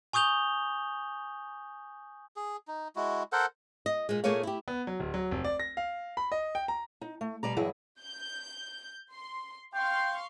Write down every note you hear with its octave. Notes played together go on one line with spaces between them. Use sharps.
G#5 C#6 D#6 G6 F7 G7
G#4
D#4
G#3 E4 F#4
A4 A#4 C5 F#5
D#5
A#2 G#3
A#2 A3 A#3 G#4 C#5 F5
E4 G4
B3
F#3
D1
F#3
F1
D5
A#6
F5
B5
D#5
G5
A#5
D#4
A3
B2 G3 D5 A#5
G2 E3 F#3 E4 G#4 D#5
G6
C6
F5 G5 C6 C#6